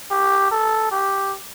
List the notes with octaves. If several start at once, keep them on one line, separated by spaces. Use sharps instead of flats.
G4
A4
G4